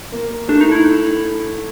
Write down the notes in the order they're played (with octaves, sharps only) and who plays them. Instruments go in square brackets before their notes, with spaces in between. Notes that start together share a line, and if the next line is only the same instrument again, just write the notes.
[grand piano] A#3
[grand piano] A3 [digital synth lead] D4
[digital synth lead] D#4
E4